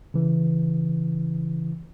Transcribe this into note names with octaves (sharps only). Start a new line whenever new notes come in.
C#3 E3